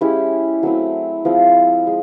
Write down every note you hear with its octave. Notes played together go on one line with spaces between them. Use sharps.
G#3 C#4 E4 G4
F#3 A3 C4 E4
F3 G#3 C4 E4
G#3